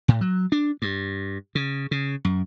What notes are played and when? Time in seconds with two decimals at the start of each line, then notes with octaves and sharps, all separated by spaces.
0.08 A2
0.21 F#3
0.52 D4
0.82 G2
1.55 C#3
1.91 C#3
2.25 F#2